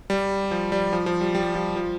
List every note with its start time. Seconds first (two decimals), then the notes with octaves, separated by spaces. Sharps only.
0.10 G3
0.51 F3
0.72 G3
0.93 F3
1.06 F3
1.21 G3
1.35 G3
1.55 F3
1.76 F3